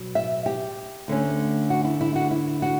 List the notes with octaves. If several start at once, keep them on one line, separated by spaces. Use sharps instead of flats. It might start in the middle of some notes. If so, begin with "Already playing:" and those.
Already playing: B2 F#3
E5
G4
D2 D3 A3 C#4
F#4
E4
E4
F#4
E4
F#4